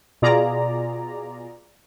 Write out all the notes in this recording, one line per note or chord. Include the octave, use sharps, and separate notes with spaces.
B2 F4 G#4 D5 A#5